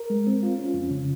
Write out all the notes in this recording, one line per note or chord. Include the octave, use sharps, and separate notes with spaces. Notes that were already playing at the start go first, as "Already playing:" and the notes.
Already playing: A#4
G#3
C4
F4
C#4
F2
C#3